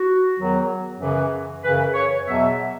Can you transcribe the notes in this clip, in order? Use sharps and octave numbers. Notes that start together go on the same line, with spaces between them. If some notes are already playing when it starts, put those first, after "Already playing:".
Already playing: F#4
E2 D#3 F#3
F#2 C#3 E3
F#2 C#3 E3 B4
C#5
E2 B2 F#3 E5